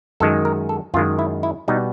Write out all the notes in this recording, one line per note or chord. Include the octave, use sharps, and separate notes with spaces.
F#2 D#3 G#3 A4
A#4
A4
F#2 D#3 G#3 F4
E4
E4
B2 G3 B3 D#4